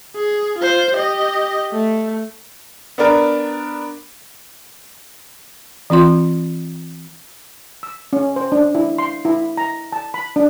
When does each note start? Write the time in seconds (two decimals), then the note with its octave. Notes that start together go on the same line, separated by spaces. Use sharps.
0.16 G#4
0.58 F4 C5
0.93 G4 D#5
1.72 A3
2.98 B3 D4 A#4
5.90 E3 C4 F4 C6
7.83 E6
8.13 C#4
8.36 C5
8.52 D4
8.75 E4
8.98 C6
9.25 E4
9.57 A#5
9.92 A5
10.14 B5
10.36 D4